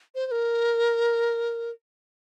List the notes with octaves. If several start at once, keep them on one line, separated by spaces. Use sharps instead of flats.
C5
C5
A#4